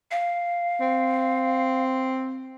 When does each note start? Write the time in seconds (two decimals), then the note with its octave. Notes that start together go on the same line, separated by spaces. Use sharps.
0.11 F5
0.81 C4